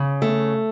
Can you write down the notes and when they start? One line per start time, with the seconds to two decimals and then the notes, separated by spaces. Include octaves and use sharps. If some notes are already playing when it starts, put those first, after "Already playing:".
Already playing: C#3
0.22 A3